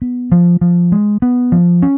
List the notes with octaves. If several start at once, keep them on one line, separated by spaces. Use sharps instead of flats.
B3
F3
F3
G#3
B3
F3
C#4